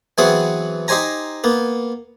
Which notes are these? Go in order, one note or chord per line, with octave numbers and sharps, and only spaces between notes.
E3 F#3 B3 C4 G#4 F#5
D#4 G4 C5 G#5 A#5
A#3 B3